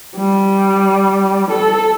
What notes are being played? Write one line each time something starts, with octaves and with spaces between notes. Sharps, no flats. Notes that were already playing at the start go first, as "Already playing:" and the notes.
G3
A4